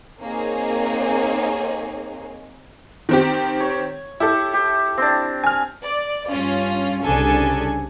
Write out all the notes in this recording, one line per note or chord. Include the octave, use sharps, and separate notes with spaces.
A#3 C4 D#4 G#4 C#5
D#3 C4 G4
C#5
E4 G4 A4
G4
C4 D4
G#5 F6
D5
G2 C#4 F4
C2 C#3 D4 A4 G#5